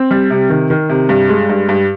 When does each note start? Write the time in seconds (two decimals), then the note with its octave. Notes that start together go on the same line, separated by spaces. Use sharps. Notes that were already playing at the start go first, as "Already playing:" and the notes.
Already playing: C4
0.11 G3
0.30 C3
0.50 D#3
0.70 D#3
0.89 C3
1.09 G2
1.29 G#3
1.49 G2
1.69 G2